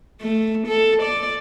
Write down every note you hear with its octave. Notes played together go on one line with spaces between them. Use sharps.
A3
A4
D5